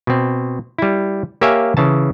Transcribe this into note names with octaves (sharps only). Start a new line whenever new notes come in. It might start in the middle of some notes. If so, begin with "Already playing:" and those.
B2 C4
G3 E4
A#3 G4 C#5 E5 F5 G#5
C#3 E3 A5